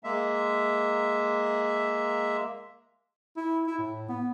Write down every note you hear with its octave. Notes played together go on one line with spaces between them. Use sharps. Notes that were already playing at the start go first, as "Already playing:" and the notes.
G#3 A#3 E5
E4
E4
A2
B3